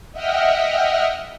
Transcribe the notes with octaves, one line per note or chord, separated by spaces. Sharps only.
D#5 E5 F#5 G5 F6